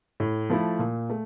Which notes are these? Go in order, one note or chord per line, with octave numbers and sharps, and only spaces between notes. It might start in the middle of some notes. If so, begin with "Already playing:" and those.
A2
F3 A3 E4
A#2
A3